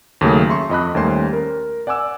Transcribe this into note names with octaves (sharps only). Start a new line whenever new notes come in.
D#2 C#3 F#3 A3
E5 C6 C#6
F2 D#5 B5 F#6
D#2 G3 A3 C#4 C5 C6
A#4
D5 F#5 G#5 D6 E6